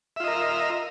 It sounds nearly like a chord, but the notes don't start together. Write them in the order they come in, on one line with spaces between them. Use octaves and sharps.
E5 F4 D#5 A#4